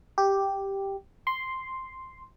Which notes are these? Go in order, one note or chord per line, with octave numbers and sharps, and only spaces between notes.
G4
C6